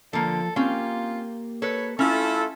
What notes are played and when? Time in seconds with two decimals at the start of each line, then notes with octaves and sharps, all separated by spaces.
0.13 D3 F3 A#3 A4
0.56 A#3 C4 C#4 F4 G4 G5
1.62 A4 B4 C#5
1.99 A3 C#4 E4 F4 A4